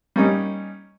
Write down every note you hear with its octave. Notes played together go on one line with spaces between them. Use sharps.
G3 A#3 C#4 D#4